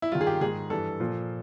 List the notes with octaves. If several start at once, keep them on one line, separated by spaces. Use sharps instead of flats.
E4
G2 D#3 F4
G#4
G4
G#2 D#3 G#4
G2 E3 A4
A#2 F3